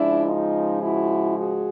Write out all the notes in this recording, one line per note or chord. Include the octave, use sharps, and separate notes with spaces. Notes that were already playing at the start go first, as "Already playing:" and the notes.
Already playing: C#3 F3 G#3 D4 E4
D#4 F4
E4 F#4
F#4 G#4